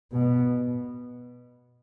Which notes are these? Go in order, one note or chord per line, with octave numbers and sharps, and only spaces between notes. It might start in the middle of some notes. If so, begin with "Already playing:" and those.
B2